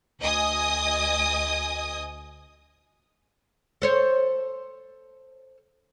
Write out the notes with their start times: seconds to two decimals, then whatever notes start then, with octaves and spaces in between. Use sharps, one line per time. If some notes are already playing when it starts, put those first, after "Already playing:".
0.20 D2 D#5 G#5 D#6
3.82 A4 C5 C#5